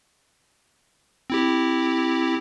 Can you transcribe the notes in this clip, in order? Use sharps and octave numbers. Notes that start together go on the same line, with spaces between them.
C4 E4 G4